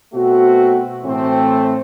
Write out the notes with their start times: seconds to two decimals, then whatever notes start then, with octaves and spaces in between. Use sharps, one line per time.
0.13 B2 A3 C4 F#4
1.03 A2 E3 A3 C4